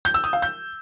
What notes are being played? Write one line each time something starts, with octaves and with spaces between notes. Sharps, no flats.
G6
E6
D#6
F5
G6